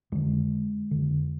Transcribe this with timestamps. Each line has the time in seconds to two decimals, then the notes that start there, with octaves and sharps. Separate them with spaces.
0.12 F2 D3 G#3
0.91 F2 D3